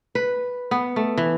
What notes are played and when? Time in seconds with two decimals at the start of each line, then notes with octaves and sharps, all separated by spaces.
0.15 B4
0.71 B3
0.96 A3
1.18 E3